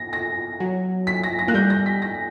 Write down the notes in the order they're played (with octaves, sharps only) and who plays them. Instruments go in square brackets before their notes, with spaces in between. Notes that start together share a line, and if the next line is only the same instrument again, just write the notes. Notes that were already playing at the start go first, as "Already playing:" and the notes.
Already playing: [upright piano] A#6
A#6
[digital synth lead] F#3
[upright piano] B6
A#6
A#6
[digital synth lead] A#3 [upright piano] F#6
[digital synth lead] G3 [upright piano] G6
[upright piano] A#6
B6
A#6